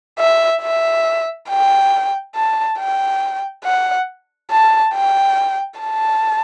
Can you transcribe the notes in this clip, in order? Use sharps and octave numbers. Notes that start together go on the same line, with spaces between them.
E5
E5
G5
A5
G5
F#5
A5
G5
A5